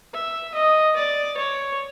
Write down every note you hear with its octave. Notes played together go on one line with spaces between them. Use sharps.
E5
D#5
D5
C#5